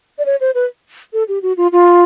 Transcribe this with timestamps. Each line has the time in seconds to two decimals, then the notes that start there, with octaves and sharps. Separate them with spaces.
0.18 D5
0.26 C#5
0.41 C5
0.55 B4
1.13 A4
1.28 G4
1.42 F#4
1.57 F4
1.72 F4